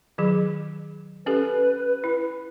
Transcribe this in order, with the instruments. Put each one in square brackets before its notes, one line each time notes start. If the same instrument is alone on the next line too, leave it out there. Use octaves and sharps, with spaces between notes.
[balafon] D#3 F#3 G#4
[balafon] C#4 G4 A4 [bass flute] B4
[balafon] E4